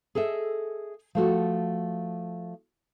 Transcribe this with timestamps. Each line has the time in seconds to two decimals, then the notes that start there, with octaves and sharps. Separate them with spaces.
0.15 G#4 A4 D#5 E5
1.15 F3 A3 F#4